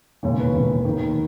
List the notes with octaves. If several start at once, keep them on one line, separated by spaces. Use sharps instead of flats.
E1 D#2 C#3 C#5
B4
E1 D#2 C#3
D#2 D#3